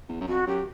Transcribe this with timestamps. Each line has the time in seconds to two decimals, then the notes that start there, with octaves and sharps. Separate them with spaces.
0.09 E2
0.21 F#2
0.28 F2 F#4
0.46 F#2 G4